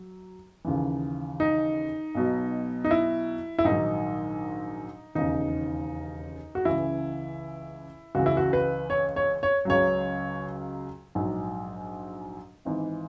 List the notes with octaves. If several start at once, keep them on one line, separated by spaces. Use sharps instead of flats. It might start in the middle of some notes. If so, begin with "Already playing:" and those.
Already playing: F#3
D#2 C#3 E3
D#4
B1 B2 F#3
D#4
E4
E4
A#1 G#2 D#3 F#3 D#4
E1 D#2 C#3 D#4
F#4
C#2 C#3 E3 E4
C#2 C#3 E3 F#4
E4
F#4
B4
C#5
C#5
C#5
C#2 C#3 F#3 C#5
A#1 G#2 F#3
G#1 G#2 E3